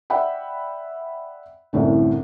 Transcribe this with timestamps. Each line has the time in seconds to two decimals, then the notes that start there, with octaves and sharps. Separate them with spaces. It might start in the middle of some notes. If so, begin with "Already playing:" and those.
0.10 D5 E5 F#5 G5 B5
1.73 C2 F#2 A2 D3